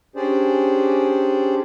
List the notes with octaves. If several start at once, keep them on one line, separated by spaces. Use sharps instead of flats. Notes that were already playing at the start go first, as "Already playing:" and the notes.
C#4 D4 G4 G#4 C5 D5